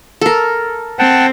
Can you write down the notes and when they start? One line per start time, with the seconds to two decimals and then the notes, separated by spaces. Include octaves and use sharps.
0.21 A4 A#4
0.99 C4 F#5 G5 A5